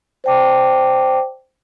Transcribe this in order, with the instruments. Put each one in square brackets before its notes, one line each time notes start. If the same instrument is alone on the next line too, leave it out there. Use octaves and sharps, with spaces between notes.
[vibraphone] C5 D5 G5 A5 D6